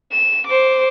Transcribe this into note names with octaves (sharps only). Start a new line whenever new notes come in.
E7
C5 D6